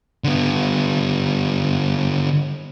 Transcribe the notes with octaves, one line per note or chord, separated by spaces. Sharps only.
D3 B3